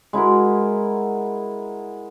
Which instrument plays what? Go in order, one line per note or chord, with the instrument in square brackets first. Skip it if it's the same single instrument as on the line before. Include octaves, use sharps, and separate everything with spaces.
[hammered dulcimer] G#3 E4 F#4 A#4